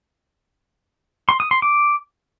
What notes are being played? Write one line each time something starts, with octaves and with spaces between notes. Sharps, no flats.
C6
D#6
C6
D6